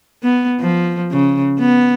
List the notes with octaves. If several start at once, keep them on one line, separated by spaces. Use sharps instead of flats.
B3
F3
C#3
B3